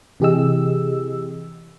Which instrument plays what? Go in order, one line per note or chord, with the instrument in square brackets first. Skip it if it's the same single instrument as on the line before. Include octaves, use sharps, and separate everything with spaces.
[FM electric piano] C3 E3 G4 G#4 D#5 E6